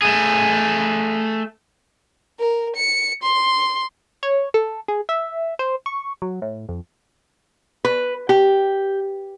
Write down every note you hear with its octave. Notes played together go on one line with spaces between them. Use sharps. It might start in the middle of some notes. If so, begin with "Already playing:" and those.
A3 G#4
A#4
C#7
C6
C#5
A4
G#4
E5
C5
C#6
F#3
A2
F2
B4
G4